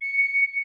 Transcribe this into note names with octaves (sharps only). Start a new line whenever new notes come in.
C#7